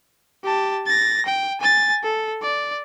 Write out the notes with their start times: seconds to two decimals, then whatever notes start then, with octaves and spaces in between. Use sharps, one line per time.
0.44 G4 A5
0.87 A6 A#6
1.26 G5
1.61 G#5 A6
2.03 A4
2.42 D5